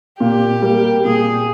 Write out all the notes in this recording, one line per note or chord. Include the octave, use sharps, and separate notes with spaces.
A#2 G4
G3 A#3
A#2 G#4